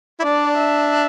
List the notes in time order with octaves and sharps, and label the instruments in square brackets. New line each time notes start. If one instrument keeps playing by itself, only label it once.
[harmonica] E4
[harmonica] D4 [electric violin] D5
[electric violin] E5